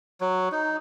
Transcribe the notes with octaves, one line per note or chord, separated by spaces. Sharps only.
F#3
D#4